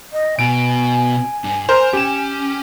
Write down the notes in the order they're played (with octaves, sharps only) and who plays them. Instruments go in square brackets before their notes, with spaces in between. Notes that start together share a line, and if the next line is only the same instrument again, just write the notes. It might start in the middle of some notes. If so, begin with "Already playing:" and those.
[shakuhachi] D#5
[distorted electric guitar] B2 [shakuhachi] G#5 [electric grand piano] D7
[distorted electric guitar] G2
[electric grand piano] A#4 C5 [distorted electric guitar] A#5
[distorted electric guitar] C#4 [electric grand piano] G4 E7